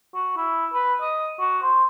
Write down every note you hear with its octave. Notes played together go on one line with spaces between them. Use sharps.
F#4
E4
B4
D#5
F#4
C5